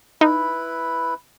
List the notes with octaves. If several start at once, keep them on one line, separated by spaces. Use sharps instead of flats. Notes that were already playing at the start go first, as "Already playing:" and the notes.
D#4 E4 B4